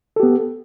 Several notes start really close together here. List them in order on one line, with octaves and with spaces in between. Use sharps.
A4 G4 B3